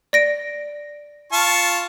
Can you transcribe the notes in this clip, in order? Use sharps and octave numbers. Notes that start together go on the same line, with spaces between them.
D5 A#6 D7
F4 A5 C#6